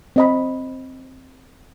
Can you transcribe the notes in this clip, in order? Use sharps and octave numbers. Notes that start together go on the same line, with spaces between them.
C4 D#5 B5